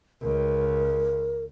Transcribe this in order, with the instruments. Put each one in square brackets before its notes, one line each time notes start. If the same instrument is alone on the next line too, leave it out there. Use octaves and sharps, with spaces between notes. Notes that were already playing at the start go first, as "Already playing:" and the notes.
[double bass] C#2 [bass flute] A#4